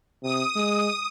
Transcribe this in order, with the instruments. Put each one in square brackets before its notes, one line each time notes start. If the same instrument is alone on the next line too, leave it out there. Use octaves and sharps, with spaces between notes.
[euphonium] C3 [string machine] D#6
[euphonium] G#3